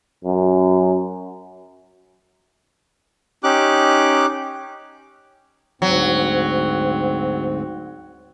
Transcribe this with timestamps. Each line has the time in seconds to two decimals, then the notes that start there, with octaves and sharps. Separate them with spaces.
0.24 F#2
3.44 C#4 D#4 G4 D6 F#6
5.82 D2 G#2 F#3 C4